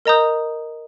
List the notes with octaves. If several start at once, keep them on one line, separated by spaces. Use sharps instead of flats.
A#4 D#5 A#5 D#6 G6